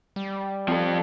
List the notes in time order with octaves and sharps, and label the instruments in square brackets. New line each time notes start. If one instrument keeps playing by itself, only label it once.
[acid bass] G3
[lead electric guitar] F3 A4 [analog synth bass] C4